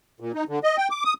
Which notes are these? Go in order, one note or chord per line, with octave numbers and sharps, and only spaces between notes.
A#2
D#4
D3
D#5
G5
D6
D#6